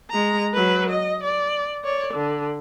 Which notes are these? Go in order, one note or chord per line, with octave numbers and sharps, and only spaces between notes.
G#3 A#5
F#3 B4
D#5
D5
C#5 D5
D3